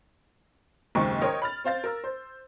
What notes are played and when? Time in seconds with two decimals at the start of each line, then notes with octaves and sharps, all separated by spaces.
0.95 F#1 D#2 G#2 G#3 C4 C#6
1.22 A#4 C5 C#5 D#5 G5
1.42 B5 F6 A6
1.64 C4 C5 F5 A6
1.84 A#4 E6
2.04 C5